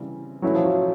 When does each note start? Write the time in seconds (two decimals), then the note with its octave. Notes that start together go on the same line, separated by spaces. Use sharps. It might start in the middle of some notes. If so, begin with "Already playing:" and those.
Already playing: C#3 E3 G3 C4
0.42 A2 E3 F#3 A3 C#4 E4
0.55 F3
0.65 F#3